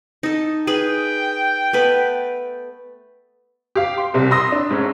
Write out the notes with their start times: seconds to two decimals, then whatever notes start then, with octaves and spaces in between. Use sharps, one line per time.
0.23 D#4 A4
0.67 G#4 B4 G5
1.73 A3 B3 B4
3.75 G4 F5
3.98 C6
4.14 C2 C3
4.31 B5 C6 D#6 E6 A#6
4.52 D4
4.71 G#2 A3 C#4